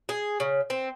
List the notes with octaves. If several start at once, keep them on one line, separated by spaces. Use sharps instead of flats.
G#4
C#3
C4